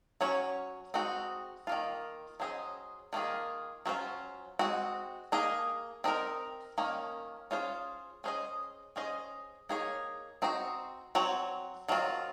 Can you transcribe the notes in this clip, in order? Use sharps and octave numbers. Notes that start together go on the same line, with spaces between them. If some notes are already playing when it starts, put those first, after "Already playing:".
F#3 C#4 F#4 C#5
G#3 C4 D#4 F#4
D#3 A#3 F4
F#3 C#4 G#4 C5 D#5
D#3 A#3 F4 G#4
F#3 C#4 F4 C5
G#3 C4 F#4
A#3 D#4 G#4 D#5
C4 D#4 A#4
D#3 A#3 C#4
C#4 F4 G#4 C5
C#4 G#4 C5 D#5
C#4 G#4 C5 D#5
A#3 D#4 G#4 C#5
C4 D#4 F#4 C5
F#3 C4 F#4 C#5
D#3 F#3 C4 F4